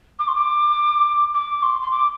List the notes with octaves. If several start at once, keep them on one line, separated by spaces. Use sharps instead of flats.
D6
C6
D6
D6
C6
C6
D6